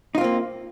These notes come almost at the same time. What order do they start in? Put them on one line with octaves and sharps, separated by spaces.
D#4 F4 C4 A#3